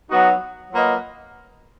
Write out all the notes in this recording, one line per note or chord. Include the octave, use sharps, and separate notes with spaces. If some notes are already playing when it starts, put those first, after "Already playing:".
F#3 B3 D#4 F#4
F#3 A#3 F4 B4 D#5